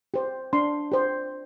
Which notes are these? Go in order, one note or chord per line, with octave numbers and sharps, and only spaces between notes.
G4 C5
D4 C6
G4 C5